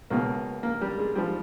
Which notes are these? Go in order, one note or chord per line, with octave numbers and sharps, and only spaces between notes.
C#2 B2 A#3
A#3
G3
G#3
G#2 F3 G3